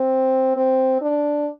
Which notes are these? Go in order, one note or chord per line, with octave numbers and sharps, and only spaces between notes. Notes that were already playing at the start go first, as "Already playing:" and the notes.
Already playing: C4
C4
D4